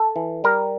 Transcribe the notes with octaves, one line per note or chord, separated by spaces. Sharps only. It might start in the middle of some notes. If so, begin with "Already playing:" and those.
Already playing: A4
E3
G3 A#4